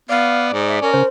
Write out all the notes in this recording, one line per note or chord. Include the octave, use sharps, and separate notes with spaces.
B3 D5 F5
G#2
E5
C#4 A#4
C#3 C5